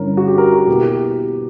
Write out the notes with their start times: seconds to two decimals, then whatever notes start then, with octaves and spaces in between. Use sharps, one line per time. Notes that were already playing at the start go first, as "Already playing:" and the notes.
Already playing: G2 D3 G3 C#4 E4 A#4
0.17 F#4
0.27 G4
0.38 A#4
0.52 F#4
0.67 B2 A#3 E4 G4
0.83 G4